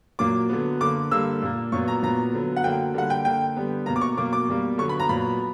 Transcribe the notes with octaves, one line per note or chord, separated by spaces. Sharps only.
A#2 F#3 A#3 D6
D3 F#3 B3
D3 A#3 D6
D3 G3 A#3 E6
A#2 A#3
A#2 F#3 B3 C#6
A#5
A#2 F#3 B3 A#5
D3 F#3 B3
F#5
D3 F#3 A#3 G5
D3 G3 A#3 F#5
G5
D3 A#3 G5
D3 G3 B3
B2 A#3 A#5
D6
C#6
B2 F#3 A#3 D6
D6
B2 G3 A#3
D3 F#3 B3 C#6
B5
A#5
A#2 F#3 B3 B5